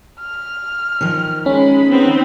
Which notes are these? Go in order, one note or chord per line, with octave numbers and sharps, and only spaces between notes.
F6
D#3 F3
G#3 C#4 B5
B3 C4 D#4